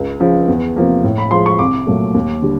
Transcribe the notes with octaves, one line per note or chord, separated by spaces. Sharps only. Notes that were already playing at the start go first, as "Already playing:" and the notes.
Already playing: C#2
C#3 F3
E2
C3 F3 A#3
A2
B5
F3 G#3 C6
C#6
C2 D6
A#2 F#3 A3
D#2
D3 G3